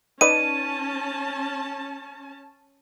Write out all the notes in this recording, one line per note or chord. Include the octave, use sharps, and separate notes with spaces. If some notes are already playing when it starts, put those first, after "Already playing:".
C#4 D#4 B4 D5 A5 D#7